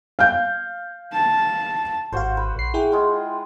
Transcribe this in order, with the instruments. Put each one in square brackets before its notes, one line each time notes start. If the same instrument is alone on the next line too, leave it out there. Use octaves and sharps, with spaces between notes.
[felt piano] F5 G6
[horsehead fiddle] A5
[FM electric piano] G#1 F5 [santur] F#4 C5
[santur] B4
[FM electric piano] A#1 C7
E4 G#4 G5
[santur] G#3 F4